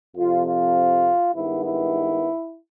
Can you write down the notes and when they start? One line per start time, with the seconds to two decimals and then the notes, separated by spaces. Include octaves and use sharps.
0.16 F2 C3 F3 F4
0.45 F4
1.34 G2 D#3 G#3 B3 E4
1.63 E4